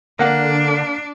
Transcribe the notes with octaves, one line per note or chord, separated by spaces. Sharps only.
D3 A#3 D4 F#5